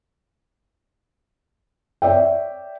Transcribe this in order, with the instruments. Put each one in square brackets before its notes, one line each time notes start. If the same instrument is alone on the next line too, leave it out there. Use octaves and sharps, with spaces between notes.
[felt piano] C#5 D5 E5 G5